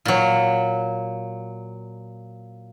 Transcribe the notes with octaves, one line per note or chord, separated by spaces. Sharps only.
A#2 F#3